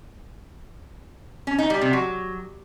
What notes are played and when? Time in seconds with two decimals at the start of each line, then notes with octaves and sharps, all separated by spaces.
1.47 C#4
1.59 D#4
1.70 G3
1.81 C3
1.93 F#3